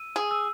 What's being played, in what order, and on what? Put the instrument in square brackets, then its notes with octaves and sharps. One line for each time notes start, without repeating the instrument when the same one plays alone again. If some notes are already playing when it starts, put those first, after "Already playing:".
Already playing: [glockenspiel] E6 D#7
[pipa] G#4
[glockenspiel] E6